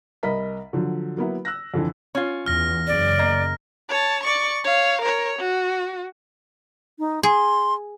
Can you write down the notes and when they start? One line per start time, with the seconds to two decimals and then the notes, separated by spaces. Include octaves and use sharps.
0.23 C2 A#4 D#5 A#5 B5 B6
0.73 D3 F3 F#3
1.17 F#3 A#3 B3 E4
1.45 E6 F#6 A#6
1.74 F2 D3 E3
2.15 C#4 F4
2.46 E2 F6 A#6
2.87 F#1 C#3 D5
3.18 A#3 D#5
3.89 C#5 A5
4.23 D5 C#6
4.64 C#5 F5
5.01 A#4 C#5
5.39 F#4
6.99 D#4
7.23 G#4 C6